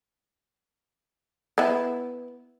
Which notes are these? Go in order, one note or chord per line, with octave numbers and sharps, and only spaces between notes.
B3 E4